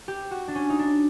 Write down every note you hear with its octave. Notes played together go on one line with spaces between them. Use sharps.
G4
F#4
D4
C#4
D#4
D4